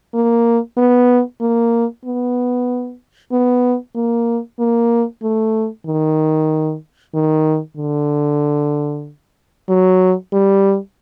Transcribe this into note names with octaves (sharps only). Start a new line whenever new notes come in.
A#3
B3
A#3
B3
B3
A#3
A#3
A3
D#3
D#3
D3
F#3
G3